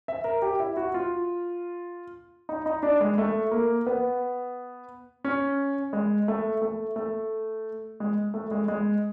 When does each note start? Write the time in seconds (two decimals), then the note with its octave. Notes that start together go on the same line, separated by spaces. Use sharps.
0.08 E5
0.24 A#4
0.42 G4
0.60 E4
0.77 F#4
0.94 F4
2.49 D#4
2.66 D#4
2.83 D4
3.01 G#3
3.18 A3
3.51 A#3
3.86 B3
5.24 C#4
5.93 G#3
6.28 A3
6.62 A3
6.96 A3
8.00 G#3
8.34 A3
8.51 G#3
8.68 G#3